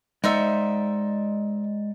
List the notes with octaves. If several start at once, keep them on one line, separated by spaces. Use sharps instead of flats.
G#3 D#4 C5 D5 E5 F#5